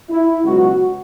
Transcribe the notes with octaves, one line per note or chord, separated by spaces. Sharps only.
E4
C#2 B2 F#3 F#4